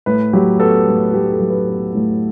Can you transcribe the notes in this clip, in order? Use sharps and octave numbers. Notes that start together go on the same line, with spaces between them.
A2 B4
F#3 G4
B3 A4
A2
A2 G4
A4
F#3
B4
B3
A2